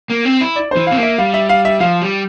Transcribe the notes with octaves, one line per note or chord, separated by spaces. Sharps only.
A#3
C4
E4
D5
E3 C5
C4 F5
A#3
E5
G3 F5
E5
F5
E5
F3 F5
G3